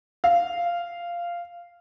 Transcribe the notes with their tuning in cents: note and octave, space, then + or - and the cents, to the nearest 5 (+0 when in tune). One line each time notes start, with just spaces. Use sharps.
F5 -10